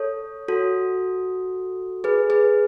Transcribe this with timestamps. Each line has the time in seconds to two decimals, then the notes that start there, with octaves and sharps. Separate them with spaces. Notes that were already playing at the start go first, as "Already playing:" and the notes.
Already playing: A4 C#5
0.48 F#4 A4
2.04 G#4 B4
2.30 G#4 B4